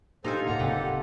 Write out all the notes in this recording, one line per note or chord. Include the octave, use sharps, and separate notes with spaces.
A#2 D#4 F4 G4 A4 C5 G#5
A2 C#3 A#3 F#5 A#5 F6
D1 A#2 C#3 C4 G4 A4 B4